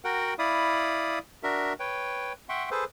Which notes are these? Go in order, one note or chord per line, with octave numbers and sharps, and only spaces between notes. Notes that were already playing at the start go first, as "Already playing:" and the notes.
F#4 A#4 F#5 G5
E4 D5 F5 B5 D#6
D4 F#4 A#4 E5
B4 C#5 G5
E5 F#5 G5 C6 C#6
G#4 A4 B4 C5